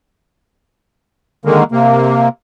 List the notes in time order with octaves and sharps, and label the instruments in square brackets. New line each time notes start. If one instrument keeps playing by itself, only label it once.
[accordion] D3 D#3 G#3 A#3
C3 A#3